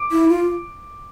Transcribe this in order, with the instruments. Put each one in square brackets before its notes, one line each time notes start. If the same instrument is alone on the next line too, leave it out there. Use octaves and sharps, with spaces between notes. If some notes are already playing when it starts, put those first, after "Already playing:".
Already playing: [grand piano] D6
[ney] E4
F4